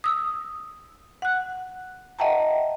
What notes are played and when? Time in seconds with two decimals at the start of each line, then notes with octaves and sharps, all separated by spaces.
0.04 D#6 E6
1.22 F#5 F#6
2.19 D#5 E5 F#5 G5 A5 A#5